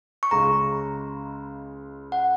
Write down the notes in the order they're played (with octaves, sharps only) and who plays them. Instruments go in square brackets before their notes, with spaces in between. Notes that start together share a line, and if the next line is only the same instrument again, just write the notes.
[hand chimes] C#6
[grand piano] C#2 C#3 G#3 [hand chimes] A#5
[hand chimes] F#5